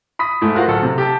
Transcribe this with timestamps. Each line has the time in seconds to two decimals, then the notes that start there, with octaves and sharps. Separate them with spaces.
0.19 B5 D#6 B6
0.41 G#2 A3 E4
0.55 F4 F#4 A#4 C5 F5
0.67 D1 A4 F#5
0.83 C3
0.98 G4 A5